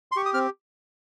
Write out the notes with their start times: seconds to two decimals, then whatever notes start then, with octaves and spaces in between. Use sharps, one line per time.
0.12 C6
0.16 G4 C#6
0.26 D#6
0.34 C4 F6